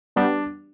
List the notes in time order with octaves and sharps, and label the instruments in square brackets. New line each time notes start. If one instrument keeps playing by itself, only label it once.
[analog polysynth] G3 B3 [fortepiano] D4